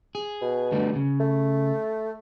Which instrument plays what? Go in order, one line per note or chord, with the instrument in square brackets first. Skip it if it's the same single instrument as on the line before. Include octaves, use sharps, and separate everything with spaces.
[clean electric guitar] G#4
[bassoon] B2
[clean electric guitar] D3 G3 A3
C#3
[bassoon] A3